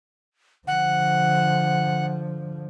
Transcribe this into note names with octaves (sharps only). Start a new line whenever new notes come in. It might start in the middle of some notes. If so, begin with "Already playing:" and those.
D3 F3 F#5